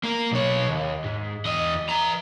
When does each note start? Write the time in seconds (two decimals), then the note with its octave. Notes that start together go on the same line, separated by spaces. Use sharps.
0.03 A#3 A#4
0.31 B1 C#5
0.69 D#2
1.04 G#2
1.45 E2 D#5
1.89 E3 A#5